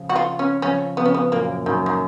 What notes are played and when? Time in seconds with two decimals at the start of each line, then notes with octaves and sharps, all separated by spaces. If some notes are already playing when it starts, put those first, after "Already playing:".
Already playing: C#3 F3
0.09 F#4
0.16 F4
0.39 C#4
0.62 C#3 F3 C#4
0.97 C#3 F3 B3
1.06 C#4
1.15 B3
1.32 F#2 A#2 A#3
1.66 F#2 D#3
1.86 D#3